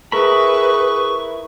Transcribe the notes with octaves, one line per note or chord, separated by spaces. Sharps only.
E4 G#4 A#4 B4 B5 C#6